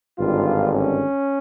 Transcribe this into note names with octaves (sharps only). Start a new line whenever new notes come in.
G#1 G2 D3 F4
C#4